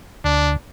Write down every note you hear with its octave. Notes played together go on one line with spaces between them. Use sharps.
D2 D4